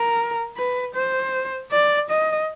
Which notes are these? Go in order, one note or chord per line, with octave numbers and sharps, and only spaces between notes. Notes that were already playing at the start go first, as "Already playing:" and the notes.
Already playing: A#4
B4
C5
D5
D#5